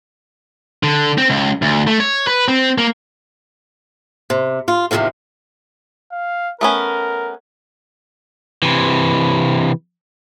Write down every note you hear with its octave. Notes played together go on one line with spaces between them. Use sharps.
D3
C4
C#2
D2
A3
C#5
B4
C4
A#3
C3
F4
E2 G2 C3 D#3 F3
F5
A3 B3 C#4 A#4
C3 E3